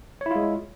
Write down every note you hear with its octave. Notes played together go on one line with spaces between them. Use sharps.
G#3 E4 F4 C#5